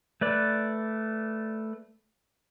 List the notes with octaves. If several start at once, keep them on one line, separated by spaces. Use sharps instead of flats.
A3 B4 D5